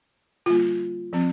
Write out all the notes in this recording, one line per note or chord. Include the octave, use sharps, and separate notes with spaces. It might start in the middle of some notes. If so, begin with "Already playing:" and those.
D3 G3 A#3 F4
F3 C4